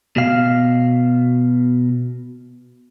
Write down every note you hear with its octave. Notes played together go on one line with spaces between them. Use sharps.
B2 F5